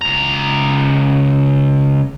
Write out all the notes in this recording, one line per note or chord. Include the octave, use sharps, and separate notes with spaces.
C#2 A#5